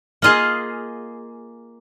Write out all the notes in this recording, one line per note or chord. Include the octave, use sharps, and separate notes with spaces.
A#3 F4 G#4 D#5